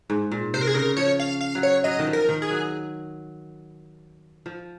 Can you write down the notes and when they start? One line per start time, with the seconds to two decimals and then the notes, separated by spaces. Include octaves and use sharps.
0.10 G#2
0.31 A#2
0.54 C3 C5
0.61 A#4
0.67 G#4
0.75 C#3 A#4
0.97 F3 C#5
1.20 F5
1.41 F5
1.55 F#3
1.63 C#5
1.84 F#3 D#5
1.99 D#3
2.07 F3
2.13 A#4
2.29 D#3
2.42 G#4
2.50 F#3
4.46 F3